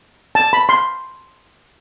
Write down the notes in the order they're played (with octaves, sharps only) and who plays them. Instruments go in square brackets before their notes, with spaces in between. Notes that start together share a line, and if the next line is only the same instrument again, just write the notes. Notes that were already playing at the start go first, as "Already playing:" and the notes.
[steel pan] A5
B5
C6